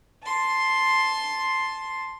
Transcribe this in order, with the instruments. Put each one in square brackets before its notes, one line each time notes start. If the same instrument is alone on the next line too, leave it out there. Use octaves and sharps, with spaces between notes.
[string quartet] A5 C6